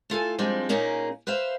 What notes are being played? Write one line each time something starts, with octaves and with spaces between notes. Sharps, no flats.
A3 F4 A4 G#5
F3 G3 G#3 C4 D4
A#2 A#3 C#4 D#4 G#4
B4 C5 E5 F5